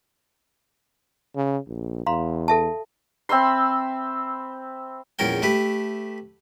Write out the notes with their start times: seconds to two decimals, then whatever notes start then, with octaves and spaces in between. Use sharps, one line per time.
1.36 C#3
1.67 A#1
2.06 E2 F5 A#5 C6
2.48 A4 E5 A5
3.29 C4 E5 B5 C6
5.19 A#1 E2 C#4 A#4 G5
5.42 A3 G4 B4